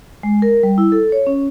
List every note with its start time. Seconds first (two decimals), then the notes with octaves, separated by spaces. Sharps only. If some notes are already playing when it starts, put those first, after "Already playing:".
0.23 G#3
0.42 A#4
0.63 G3
0.78 E4
0.92 A4
1.12 C#5
1.27 C#4